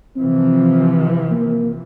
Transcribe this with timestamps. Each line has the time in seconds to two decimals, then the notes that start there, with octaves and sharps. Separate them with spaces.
0.17 C3 E3 F3 C4
1.31 A#3